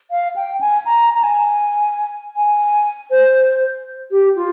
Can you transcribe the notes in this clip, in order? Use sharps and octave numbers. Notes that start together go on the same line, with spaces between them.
F5
G5
G#5
A#5
A#5
G#5
G#5
C5
G4
F4